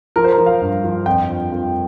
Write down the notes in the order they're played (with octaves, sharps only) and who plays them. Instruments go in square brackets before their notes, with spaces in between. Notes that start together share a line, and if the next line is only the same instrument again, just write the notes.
[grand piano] F3 A#4
C5
A#4
F3
F5
G2
F3
F2 G5
F2
F2